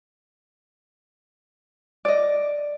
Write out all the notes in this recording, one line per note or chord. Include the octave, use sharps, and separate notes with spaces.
D5 D#5